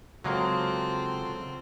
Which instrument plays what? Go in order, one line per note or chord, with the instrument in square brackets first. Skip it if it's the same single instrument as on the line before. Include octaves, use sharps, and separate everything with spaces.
[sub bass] C#3 [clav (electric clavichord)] F#3 G#3 A#3 [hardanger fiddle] C4 [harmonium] F4 F#4 A4